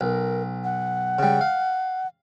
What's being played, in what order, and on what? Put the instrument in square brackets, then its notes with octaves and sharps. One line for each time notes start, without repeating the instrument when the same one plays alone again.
[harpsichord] B1 [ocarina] A#4
[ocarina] F#5
[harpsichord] C#3 G3
F5